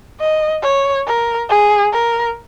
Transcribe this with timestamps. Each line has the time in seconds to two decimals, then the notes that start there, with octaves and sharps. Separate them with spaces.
0.20 D#5
0.62 C#5
1.07 A#4
1.49 G#4
1.92 A#4